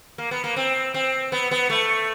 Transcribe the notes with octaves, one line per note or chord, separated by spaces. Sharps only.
A#3
B3
A#3
C4
C4
B3
B3
A3